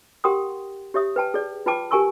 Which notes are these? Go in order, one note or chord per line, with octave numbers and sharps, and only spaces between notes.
G4 A#4 F#5 G5 C6 D#6
G4 C#5 E5 D#6
B4 G5 A5
G#4 D5
F4 B4 G5 A5 D6
G4 A#4 G#5 A5 C#6 E6